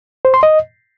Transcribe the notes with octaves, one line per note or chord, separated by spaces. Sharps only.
C5
C6
D#5